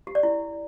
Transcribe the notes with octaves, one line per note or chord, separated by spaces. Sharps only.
G4
D5
E4